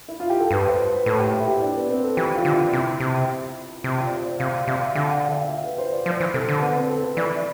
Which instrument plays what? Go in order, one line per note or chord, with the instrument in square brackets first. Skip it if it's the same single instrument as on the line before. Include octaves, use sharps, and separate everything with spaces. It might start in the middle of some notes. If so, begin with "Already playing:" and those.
[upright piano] E4
F4
G4
A4
[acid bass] G2 [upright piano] B4
[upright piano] C5
B4
[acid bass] A2 [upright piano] A4
[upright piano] G4
E4
G4
D4
B3
C4
A4
[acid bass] E3 [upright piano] G4
[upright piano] F4
[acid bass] D3 [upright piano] D4
[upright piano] E4
[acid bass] C3
C3
C3
[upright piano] F4
D5
C5
C5
[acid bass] C3 [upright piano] F5
[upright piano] F5
[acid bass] C3 [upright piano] E5
[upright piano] F5
[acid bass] D3 [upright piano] G5
[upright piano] F5
G5
E5
F5
E5
B4
C5
D5
[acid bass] F3 [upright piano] C5
[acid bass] E3
[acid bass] C3 [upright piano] A4
[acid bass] D3
[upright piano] B3
C4
A4
B4
[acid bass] E3 [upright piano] D5
[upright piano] E4